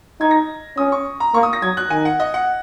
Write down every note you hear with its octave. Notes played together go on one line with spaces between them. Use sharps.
D#4 G#6
A#6
C#4 D#6
C#6
A#5
A#3 C#6
D#6
A#6
F#3 G#6
F#6
D#3 G#5
F#5
D#5
F#5